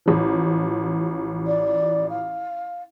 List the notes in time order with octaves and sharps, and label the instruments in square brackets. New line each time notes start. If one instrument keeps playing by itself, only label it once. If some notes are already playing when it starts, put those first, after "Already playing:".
[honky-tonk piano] A1 F3
[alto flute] D5
F5